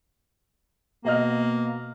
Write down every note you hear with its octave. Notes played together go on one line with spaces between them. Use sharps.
B2 A#3 D#5 F6